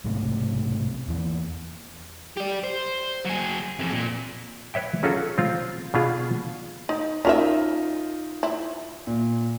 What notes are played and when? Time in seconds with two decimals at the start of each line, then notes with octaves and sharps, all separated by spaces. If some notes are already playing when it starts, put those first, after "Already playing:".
0.05 B1 G#2 C3 A3
1.08 E2 E3 A#3
2.37 G4 D5
2.64 C5
3.25 F#3 G#4
3.79 F2 E3
3.93 A#2
4.74 B4 C#5 E5 G5
5.03 F#3 C#4 F4 F#4 G#4 A4
5.38 C4 F4
5.94 B2 D4 F4 G#4
6.89 D#4
7.25 C#4 D#4 F4 A#4 E5
8.43 E4
9.07 A#2